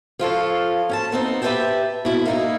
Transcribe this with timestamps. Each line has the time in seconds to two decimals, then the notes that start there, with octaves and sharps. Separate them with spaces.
0.19 F3 F4 A4 C#5
0.89 C#4 G#5 A5
1.12 B3 C4 D#4
1.42 G4 B4 C#5 E5 G5 A5
2.05 B2 E4
2.26 A#3 D#4 E4